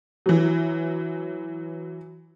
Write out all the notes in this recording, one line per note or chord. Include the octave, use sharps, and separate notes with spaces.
E3 F#3